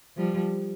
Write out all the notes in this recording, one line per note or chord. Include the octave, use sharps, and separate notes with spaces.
F3 G3